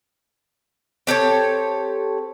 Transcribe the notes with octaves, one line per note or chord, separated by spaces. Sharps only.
C4 G4 A4 C#5